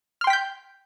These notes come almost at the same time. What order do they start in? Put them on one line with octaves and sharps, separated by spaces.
F6 C6 G5 B6 G6